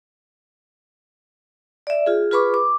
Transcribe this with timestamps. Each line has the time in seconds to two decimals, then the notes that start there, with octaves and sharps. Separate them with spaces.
1.87 D5 E5
2.06 F4 G#4
2.31 F4 G#4 B4 B5 C#6 D6
2.54 D6